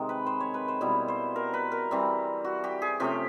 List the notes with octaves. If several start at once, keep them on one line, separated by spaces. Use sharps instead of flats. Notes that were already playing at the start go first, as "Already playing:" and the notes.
Already playing: C3 D#3 G#3
B4
C5
C#5
B4
C5
B2 G3 B3 E4
C5
A#4
B4
A#4
E3 G3 C4
F#4
G4
G#4
C3 F3 A3 C#4 G4